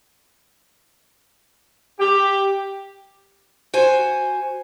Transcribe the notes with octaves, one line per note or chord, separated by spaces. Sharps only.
G4
F#4 C5 G#5